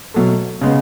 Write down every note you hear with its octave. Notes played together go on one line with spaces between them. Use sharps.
B2 F#3 A3
C#3 G#3 B3